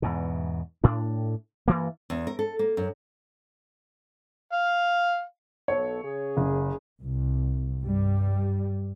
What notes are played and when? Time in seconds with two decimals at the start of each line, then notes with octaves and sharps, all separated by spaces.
0.02 E2 G#2 B2
0.84 A2 D4
1.68 G2 E3 A#3
2.10 E2
2.27 A#4
2.39 A4
2.59 A#3
2.77 F#2
4.52 F5
5.68 B1 B3 A4 C#5
6.04 C#3 G#4
6.37 F#1
7.01 C2
7.82 G2 G3